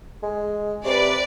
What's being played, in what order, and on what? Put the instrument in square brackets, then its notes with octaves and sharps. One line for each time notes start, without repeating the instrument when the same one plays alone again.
[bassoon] G#3
[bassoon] C3 [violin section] B4 D5